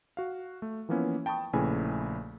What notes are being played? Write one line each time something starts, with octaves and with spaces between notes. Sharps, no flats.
F#4 F5
A3
E3 F3 A#3 B3 C#4 E4
G5 A5 B5 C#6 D#6
A#1 C#3 A3 E4 B4 G#5